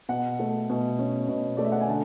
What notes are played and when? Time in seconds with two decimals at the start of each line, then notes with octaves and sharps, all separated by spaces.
0.09 B2 F#5
0.39 A3
0.70 B2
0.99 C#4
1.29 B2
1.57 A3 D5
1.65 E5
1.72 F#5
1.80 G#5
1.88 D3 A5